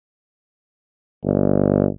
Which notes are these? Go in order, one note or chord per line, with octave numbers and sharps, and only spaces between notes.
G1